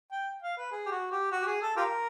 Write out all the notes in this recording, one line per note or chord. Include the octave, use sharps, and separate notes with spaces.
G5
F5
B4
G#4
G4
F#4
G4
F#4
G4
G#4
A4
F4 G4 A#4